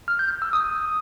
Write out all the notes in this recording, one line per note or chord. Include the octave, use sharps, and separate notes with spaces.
F6
G6
G6
E6
D#6